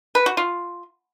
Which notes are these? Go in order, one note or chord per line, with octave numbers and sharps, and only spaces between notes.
B4
F#4
F4